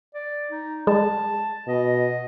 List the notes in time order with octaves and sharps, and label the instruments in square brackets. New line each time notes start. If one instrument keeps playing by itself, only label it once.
[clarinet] D5
D#4
[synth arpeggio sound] G#3 [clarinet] A5
[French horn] B2 [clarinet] D#5